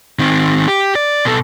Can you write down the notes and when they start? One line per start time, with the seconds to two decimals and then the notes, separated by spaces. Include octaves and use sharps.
0.19 D#3 C4
0.68 G4
0.95 D5
1.25 B2 A4